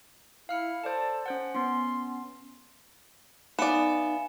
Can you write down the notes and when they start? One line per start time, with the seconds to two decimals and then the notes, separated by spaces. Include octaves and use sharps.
0.49 E4 F5 F6 C#7
0.84 A4 C5 D5 A5
1.26 C#4 C5 F#5
1.55 B3 C#4 C6
3.59 B3 D#4 D5 E5 F5 G#5 C#7 E7